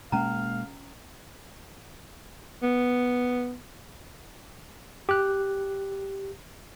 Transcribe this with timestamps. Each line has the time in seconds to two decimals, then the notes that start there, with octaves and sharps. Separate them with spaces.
0.12 B2 G#3 A#3 C#4 F5 A#5
2.63 B3
5.09 G4 F#6